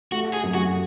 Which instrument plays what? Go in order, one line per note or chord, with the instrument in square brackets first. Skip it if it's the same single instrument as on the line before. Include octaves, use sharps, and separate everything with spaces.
[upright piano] A3 [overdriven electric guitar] F#4
[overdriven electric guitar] G#4
[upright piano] F#2
[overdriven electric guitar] F#4